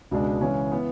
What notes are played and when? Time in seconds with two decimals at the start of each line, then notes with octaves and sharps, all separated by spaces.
0.11 C#2 B2 G#3 D4
0.41 C#3 E3 G#3 C#4
0.72 E3 B3